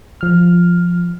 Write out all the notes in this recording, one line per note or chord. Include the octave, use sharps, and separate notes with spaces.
F3 F6